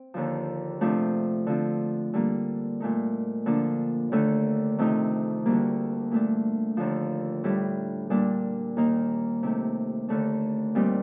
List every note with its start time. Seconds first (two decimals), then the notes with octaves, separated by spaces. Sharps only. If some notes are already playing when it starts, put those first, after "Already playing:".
Already playing: C4
0.14 D#2 D3 F3
0.81 C3 F3 A3 D4
1.47 D3 F3 C4
2.13 D3 G3 A#3
2.80 A#2 A3 D#4
3.46 D3 F3 A#3 D4
4.12 D#2 D3 A3
4.78 F2 C3 D#3 A3 D#4
5.45 D2 D3 G3 A#3
6.11 A#2 A3 D4
6.77 D#2 D3 F3
7.44 A2 G3 D4
8.10 A#2 G3 D4
8.77 D#2 D#3 A#3 D#4
9.43 C3 D#3 A3
10.08 D#2 D3 A3 D4
10.75 A#2 G3 C4 D#4